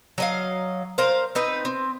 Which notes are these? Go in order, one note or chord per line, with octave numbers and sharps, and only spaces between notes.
F#3 D#5 F5
A#4 C5 F5
C4 D#4 B4
C4